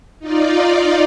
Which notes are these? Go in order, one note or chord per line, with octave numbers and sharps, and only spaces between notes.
D#4 F4 D5